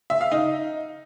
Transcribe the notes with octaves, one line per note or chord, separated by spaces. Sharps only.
E5
F5
D#4